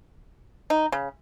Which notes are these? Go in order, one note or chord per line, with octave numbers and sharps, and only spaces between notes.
D#4
C#3